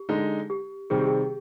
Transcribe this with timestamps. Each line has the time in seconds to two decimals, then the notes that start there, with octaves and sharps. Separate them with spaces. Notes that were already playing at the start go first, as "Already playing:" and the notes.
Already playing: G4
0.09 D3 G#3 D#4
0.50 G4
0.90 C3 D#3 G3 C4 G#4
0.98 G4
1.07 G#4